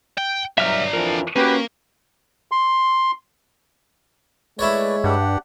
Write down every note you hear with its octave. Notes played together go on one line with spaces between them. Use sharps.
G5
G2 B2 F#3 D4 E5 A#5 F6
F2 E3 F3 A#4
A#3 C#4 F#4 G4 B4
C6
G#3 A3 E4 B4 C#5 D5
G2 D4 G4 F#5